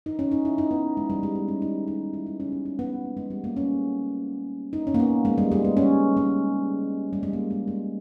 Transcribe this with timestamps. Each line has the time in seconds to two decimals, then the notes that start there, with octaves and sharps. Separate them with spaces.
0.06 D#4
0.19 C#4
0.32 D#4
0.45 E4
0.58 D#4
0.71 B3
0.97 G#3
1.10 G3
1.23 G#3
1.35 B3
1.48 C#4
1.62 D#4
1.88 D#4
2.13 E4
2.26 D#4
2.40 C#4
2.52 B3
2.65 C#4
2.79 B3
3.05 A#3
3.17 G#3
3.30 G3
3.44 A#3
3.56 C#4
4.73 D#4
4.87 C#4
4.94 A#3
5.00 B3
5.25 G#3
5.38 G3
5.51 G#3
5.64 B3
5.77 C#4
6.17 G#3
7.13 G3
7.23 G#3
7.33 A#3
7.50 G#3
7.68 G#3